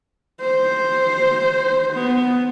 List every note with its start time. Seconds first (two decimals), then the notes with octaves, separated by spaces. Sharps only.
0.41 C5
1.93 B3